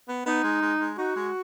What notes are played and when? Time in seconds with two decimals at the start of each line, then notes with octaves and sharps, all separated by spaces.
0.09 B3
0.27 B3 D#4
0.44 G#3
0.62 G#3
0.80 G#3
0.98 D#4 F#4
1.17 G#3